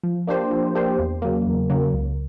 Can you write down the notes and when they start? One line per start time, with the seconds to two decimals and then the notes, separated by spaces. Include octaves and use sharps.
0.03 F3
0.27 A#3 D4 G4 C5
0.51 F3
0.75 A#3 D4 G4 C5
0.99 E2
1.22 C#3 F#3 A#3
1.46 E2
1.70 C#3 F#3 A#3
1.94 C#2